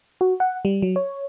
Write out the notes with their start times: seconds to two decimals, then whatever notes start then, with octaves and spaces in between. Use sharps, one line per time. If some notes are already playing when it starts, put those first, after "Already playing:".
0.21 F#4
0.40 F#5
0.65 G3
0.82 F#3
0.96 C#5